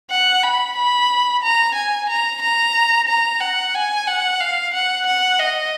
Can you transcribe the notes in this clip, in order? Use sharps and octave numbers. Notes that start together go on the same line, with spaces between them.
F#5
B5
B5
A#5
G#5
A#5
A#5
A#5
F#5
G#5
F#5
F5
F#5
F#5
D#5